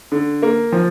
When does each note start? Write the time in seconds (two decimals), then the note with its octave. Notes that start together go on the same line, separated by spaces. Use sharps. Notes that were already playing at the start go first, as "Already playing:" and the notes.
0.12 D3
0.42 A#3
0.72 F3